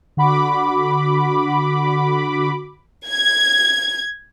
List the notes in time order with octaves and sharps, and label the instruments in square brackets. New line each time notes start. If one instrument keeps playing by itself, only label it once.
[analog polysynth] D3 F#4 B5 D6
[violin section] G#6